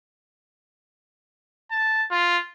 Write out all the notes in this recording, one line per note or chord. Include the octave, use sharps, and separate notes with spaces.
A5
F4